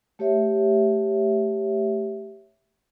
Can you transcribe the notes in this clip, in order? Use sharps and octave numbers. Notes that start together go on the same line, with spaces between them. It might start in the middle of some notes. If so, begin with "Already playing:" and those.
A3 G4 C#5 E5